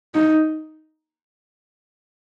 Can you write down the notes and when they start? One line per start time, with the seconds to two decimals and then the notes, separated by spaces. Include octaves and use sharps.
0.15 D#4